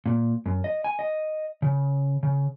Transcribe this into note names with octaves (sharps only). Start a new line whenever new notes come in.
A#2
F#2
D#5
G#5
D#5
C#3
C#3